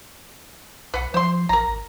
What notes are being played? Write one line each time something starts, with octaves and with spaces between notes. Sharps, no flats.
B1 B4 F#5
F3 C5 C6
A1 A#4 A#5
G#1